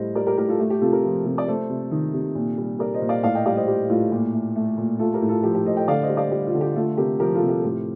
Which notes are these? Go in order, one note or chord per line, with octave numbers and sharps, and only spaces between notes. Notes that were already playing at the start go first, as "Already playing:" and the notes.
Already playing: A2 G3 C5 D#5
G3 A#4 D5
G4 A#4
A2 G4 A#4
F4 A4
A3 G4
G4
C3 F4 A4
G4 A#4
F3
C3
D5
A3 A4 C5
C3
D#3
C3
A#2
G3
G3 A#4 D5
C5 D#5
A#2
D5 F5
A2 D5 F5
D#5 G5
G3 D5 F5
C5 D#5
G3 G4
A2 F4
A#2 G4
A3
A3
A#2
A3 F4 A4
G4 A#4
A2
F4 A4
F3 G4
G4
A2 C5 D#5
D#5 G5
D3 D5 F5
C5 D#5
G3
D5 F5
G3 G4
F4
D3
G4
A3 F4 A4
C3 G4 A#4
F3 G4 A#4
F4 A4
C3
G4
A4
A2 G4